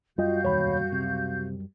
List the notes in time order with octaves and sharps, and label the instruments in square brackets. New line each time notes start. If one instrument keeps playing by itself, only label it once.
[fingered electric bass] F#2 G3 [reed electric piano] F4 D#5 [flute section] F#4 F5 G6
[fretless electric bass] E1 D#2 [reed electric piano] C#5 B5
[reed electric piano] C#2 [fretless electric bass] C3